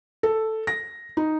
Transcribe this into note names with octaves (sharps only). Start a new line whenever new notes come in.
A4
A#6
D#4